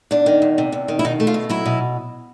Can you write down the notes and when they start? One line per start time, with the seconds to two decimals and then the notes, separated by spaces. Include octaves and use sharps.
0.11 E2 D4
0.26 D#3
0.42 E2
0.58 C3
0.72 E2
0.88 D#3
0.99 E4
1.05 B2 D#4
1.20 A3
1.27 F4
1.34 B2
1.50 F#3 E4
1.66 B2